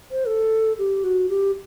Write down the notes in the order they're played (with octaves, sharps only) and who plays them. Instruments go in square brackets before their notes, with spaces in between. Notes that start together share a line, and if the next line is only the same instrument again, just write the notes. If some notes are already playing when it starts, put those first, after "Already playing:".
[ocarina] C5
A4
G4
F#4
G4